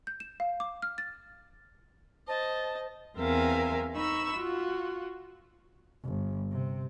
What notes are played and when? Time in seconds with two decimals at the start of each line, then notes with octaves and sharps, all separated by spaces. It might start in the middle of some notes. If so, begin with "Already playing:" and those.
0.07 G6
0.20 E7
0.40 F5
0.60 D6
0.82 F6
0.98 A6
2.28 C5 D#5 A5
3.17 E2 C4 A#4 E5 F5 G#5
3.94 D#4 B5 C#6 E6
4.37 F4 F#4
6.03 G1
6.51 C3